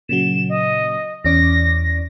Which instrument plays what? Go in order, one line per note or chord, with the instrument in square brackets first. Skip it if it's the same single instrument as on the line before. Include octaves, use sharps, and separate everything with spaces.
[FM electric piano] A#2 C#3 F#3 [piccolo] E7
[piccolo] D#5
[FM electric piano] E2 C#4 D5 [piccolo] A#6
[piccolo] A#6